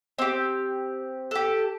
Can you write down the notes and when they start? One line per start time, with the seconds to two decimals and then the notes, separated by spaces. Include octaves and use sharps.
0.18 C4 G4
1.31 G4 A4